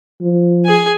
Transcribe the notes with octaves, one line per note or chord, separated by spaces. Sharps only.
F3
G#4 G#5